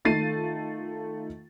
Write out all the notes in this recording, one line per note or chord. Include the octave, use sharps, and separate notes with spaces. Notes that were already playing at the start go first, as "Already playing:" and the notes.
D#3 A3 F4 A6 C7 D#7